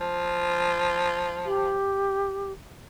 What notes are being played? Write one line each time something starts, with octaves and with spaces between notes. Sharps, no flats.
F3
G4